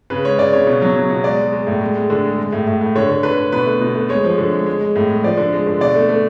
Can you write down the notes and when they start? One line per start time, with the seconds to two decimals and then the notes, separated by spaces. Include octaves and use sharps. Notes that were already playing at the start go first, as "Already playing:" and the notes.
0.10 C#3 B4
0.25 G#3 C#5
0.38 C#3 D5
0.53 C#3 C#5
0.67 B2
0.82 F#3
0.96 F#3
1.10 B2
1.24 G#3 D5
1.39 G#3
1.52 G#3
1.67 A2
1.81 G#3
1.95 G#3
2.10 D3
2.24 G#3
2.38 G#3
2.52 A2
2.67 A2
2.81 A2
2.96 D3 C#5
3.10 D3
3.23 D3 B4
3.38 D3
3.52 B2 B4
3.66 A3
3.81 B2
3.95 A3
4.09 G#3 C#5
4.24 F3
4.38 D3
4.52 G#3
4.66 G#3
4.81 G#3
4.96 A2
5.09 G#3
5.23 F3 D5
5.38 D3
5.53 G#3
5.67 D3
5.80 B2 D5
5.96 A3
6.09 A3